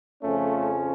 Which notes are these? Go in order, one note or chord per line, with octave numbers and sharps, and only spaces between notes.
F2 C#3 F3 A3 C#4